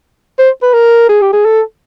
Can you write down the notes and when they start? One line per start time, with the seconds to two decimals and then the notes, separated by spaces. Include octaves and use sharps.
0.39 C5
0.62 B4
0.73 A#4
1.09 G#4
1.22 G4
1.33 G#4
1.45 A4